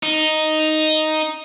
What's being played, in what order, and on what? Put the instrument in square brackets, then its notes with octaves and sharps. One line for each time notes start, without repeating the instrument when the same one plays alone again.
[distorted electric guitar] D#4